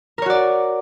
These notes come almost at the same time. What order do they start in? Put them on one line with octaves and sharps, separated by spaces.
A#4 C#5 F#4 D5